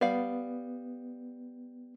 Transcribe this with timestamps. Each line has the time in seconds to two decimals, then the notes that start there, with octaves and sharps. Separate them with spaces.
0.01 G3 B3 D5 F5